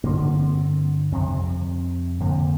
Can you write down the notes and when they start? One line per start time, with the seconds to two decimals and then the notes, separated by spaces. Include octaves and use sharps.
0.04 G2 D3 A#3
0.22 A#3
0.40 C4
1.12 F2 C3 C4
2.20 F2 D3 A#3